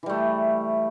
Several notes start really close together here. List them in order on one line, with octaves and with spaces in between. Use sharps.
E3 G3 A3